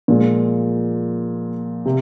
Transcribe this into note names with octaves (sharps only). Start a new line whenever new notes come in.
A#2 F3 G#3
C3